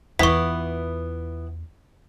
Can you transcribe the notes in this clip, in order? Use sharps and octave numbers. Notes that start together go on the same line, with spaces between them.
E2 E3 B3 F4 C#6 B6